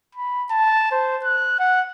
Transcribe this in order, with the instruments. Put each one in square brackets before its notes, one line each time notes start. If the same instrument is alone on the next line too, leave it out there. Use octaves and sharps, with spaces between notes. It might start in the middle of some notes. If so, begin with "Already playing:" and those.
[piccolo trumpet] B5
A5
C5
F#6
F#5